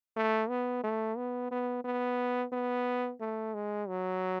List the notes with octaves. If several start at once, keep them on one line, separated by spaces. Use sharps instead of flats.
A3
B3
A3
B3
B3
B3
B3
A3
G#3
F#3